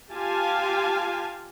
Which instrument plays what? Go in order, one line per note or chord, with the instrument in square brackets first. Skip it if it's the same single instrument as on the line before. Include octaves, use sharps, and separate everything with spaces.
[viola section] F4 G4 F5 G#5 A5